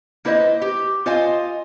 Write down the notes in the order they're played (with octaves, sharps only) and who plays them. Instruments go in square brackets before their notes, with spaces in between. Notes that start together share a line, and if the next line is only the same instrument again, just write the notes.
[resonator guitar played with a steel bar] A#3 E4 B4 C5 D5 D#5
G4
F4 C5 D#5 F5 G#5